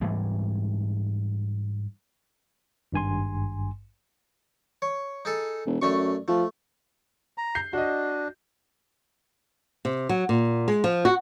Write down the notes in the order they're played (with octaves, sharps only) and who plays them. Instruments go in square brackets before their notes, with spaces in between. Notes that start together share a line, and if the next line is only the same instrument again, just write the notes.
[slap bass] G#2 E3 G3 G#3
[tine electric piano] G#1 G2 G#5 C6
[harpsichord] C#5
D#4 G#4 A4
[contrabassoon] E1
[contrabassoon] F#2 [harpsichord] A3 D4 C#6
[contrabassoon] F3 [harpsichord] A3
[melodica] A#5
[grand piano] G6 C7
[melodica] D4 [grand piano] F#4 D#5
[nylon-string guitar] C3
F#3
A#2
G#3
F3
F#4